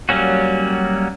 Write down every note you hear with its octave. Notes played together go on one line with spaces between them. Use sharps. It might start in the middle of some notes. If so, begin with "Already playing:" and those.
F#3 G3 A#3 C#4 F#4